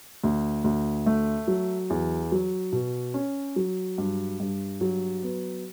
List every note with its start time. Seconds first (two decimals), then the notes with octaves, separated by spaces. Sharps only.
0.24 D2
0.64 D2
1.06 A3
1.48 F#3
1.90 E2
2.32 F#3
2.72 B2
3.14 C#4
3.56 F#3
3.98 G2
4.40 G2
4.81 F#3
5.23 B3